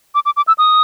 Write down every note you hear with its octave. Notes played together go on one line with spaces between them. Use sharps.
D6
D6
D6
E6
D#6